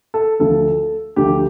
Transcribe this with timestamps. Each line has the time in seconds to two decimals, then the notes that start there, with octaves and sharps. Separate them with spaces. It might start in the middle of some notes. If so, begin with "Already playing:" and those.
0.14 A4
0.39 D2 D3 F3 A4
1.16 D2 D3 F3 G4